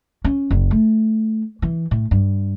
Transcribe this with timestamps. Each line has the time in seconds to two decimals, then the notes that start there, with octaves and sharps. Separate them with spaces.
0.24 C#4
0.51 F#1
0.71 A3
1.62 E3
1.91 A2
2.11 G2